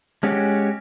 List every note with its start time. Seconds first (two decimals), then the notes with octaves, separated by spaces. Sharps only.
0.23 G#3 C#4 F#4 G4